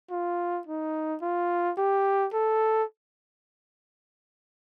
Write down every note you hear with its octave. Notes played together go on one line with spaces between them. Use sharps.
F4
D#4
F4
G4
A4